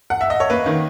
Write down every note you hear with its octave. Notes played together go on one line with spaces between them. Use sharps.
F#5
E5
D#5
C#5
A#3 B4
D#3